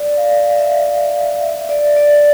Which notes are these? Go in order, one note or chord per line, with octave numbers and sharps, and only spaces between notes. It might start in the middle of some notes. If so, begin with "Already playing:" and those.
Already playing: D5
F5
E5
E5
D5
D5